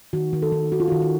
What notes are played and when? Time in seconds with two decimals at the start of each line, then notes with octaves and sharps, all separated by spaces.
0.13 D#3 F#4
0.33 D#3
0.42 A4
0.52 D#3
0.72 D#3 F#4
0.80 F4
0.88 D#3 F#4
1.02 F#4